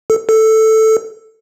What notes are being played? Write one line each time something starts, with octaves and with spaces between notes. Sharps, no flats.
A4
A4